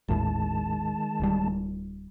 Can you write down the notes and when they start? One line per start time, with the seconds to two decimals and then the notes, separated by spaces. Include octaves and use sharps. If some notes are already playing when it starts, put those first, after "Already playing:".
0.09 G#1 D#2 A2 D#3 G#3 A5
1.20 D1 G3